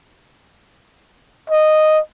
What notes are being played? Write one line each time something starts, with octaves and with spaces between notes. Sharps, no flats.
D#5